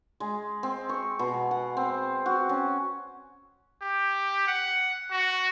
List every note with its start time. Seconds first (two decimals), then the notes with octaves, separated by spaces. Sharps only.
0.20 G#3
0.63 C4
0.89 C#6
1.19 B2
1.51 F#5
1.77 C4
2.26 F#4
2.49 C#4
3.82 G4
4.48 F#5
5.11 F#4